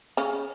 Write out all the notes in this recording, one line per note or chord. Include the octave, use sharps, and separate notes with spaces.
C#3 C#4